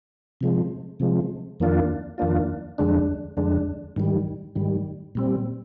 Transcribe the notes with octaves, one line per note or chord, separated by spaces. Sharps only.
C3 F3 G#3
C3 F3 G#3
F2 D#3 A#3 D4 F4
F2 D#3 A#3 D4 F4
F2 D3 G#3 D4
F2 D3 G#3 D4
G#2 D#3 G3
G#2 D#3 G3
A#2 G3 C4